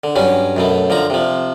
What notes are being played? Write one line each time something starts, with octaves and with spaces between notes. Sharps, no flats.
D3
G2 F#3 C#4
F#2 B2 A3
D3 F3 A#5
C3 F3